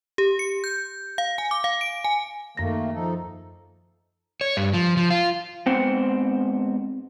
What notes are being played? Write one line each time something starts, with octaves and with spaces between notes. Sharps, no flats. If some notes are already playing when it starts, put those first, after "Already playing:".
G4
C#7
G6
F5
G#5
D6
F5
D7
G#5
F#2 D#3 A3 A#3 A#6
F3 D#4 A4
C#5
G2
F3
F3
F4
G#2 B3 C4 C5 F#5 G5